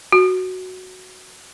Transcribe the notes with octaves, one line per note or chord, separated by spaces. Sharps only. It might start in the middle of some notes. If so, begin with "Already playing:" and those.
F#4